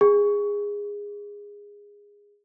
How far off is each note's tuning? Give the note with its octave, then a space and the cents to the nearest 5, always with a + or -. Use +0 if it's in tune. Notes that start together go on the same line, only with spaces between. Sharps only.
G#4 -20